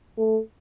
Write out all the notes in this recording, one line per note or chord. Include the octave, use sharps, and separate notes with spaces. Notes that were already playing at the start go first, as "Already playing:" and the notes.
A3